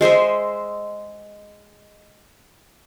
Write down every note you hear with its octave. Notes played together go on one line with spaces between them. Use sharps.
G#3 C5 D#5 E5